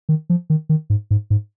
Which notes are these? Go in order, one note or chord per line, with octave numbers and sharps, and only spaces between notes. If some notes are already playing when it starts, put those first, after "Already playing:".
D#3
F3
D#3
D#3
G#2
G#2
G#2